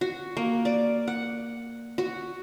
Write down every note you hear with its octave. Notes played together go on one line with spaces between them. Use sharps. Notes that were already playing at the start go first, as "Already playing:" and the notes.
F#4
A#3
D5
F#5
F#4